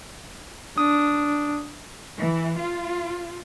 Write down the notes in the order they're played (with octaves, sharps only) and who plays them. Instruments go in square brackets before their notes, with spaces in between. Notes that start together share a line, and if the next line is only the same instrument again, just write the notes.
[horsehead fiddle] D4 [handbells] D#6
[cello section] E3
F4